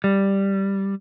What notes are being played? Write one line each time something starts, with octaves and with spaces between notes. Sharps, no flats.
G3